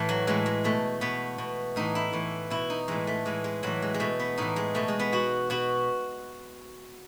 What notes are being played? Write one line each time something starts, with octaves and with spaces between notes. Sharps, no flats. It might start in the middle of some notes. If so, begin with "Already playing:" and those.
Already playing: A2 E3 A3
F#3
A2 E3 G#3
G#3
B2 A3
B2 B3
B2
A2 E3 D#4
E4
A2 E3
B2 E4
D#4
A2 E3 G#3
A3
A2 E3 G#3
G#3
A2 E3 F#3
G#3
G#3
B2 A3
B3
A2 E3 D#4
G#3
B2 A3
G#3
B3
B2 F#4
B2 F#4